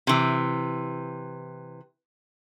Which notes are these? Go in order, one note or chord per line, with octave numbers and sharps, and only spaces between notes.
C3 E3